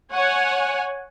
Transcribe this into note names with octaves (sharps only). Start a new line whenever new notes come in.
C#5 F#5 G#5